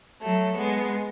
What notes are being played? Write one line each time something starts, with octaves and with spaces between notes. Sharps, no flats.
F#3 A3
G#3 B3